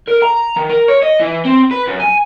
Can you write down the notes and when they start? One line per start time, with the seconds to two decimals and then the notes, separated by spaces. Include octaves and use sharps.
0.08 A#4
0.23 A#5
0.56 D#3
0.69 A#4
0.88 C#5
1.02 D#5
1.20 E3
1.45 C4
1.71 B4
1.87 F#2
2.00 G#5